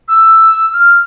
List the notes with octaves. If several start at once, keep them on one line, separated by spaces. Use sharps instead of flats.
E6
F6